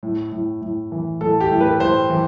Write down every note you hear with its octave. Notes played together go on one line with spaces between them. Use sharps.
A2
A2
A2
E3
A2 A4
G4
A2
B4
A2 C5
E3